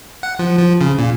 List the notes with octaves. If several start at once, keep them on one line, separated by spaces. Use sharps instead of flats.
F#5
F3
F3
C#3
A#2